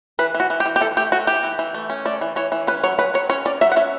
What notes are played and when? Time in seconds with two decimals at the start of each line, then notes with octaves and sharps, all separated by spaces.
0.19 E3 B4
0.34 E3
0.40 F#4
0.50 E3
0.60 G4
0.66 E3
0.76 G4
0.81 E3 A4
0.97 A3 G4
1.12 A3 F#4
1.27 E3 G4
1.43 E3
1.59 E3
1.74 A3
1.90 C#4
2.05 A3 D5
2.21 E3
2.36 E3 C#5
2.52 E3
2.67 C#4 B4
2.83 F#3 C#5
2.98 F#3 B4
3.14 F#3 C#5
3.30 C#4 C#5
3.45 C#4 D5
3.61 F#3 E5
3.72 F#5
3.76 C#4 E5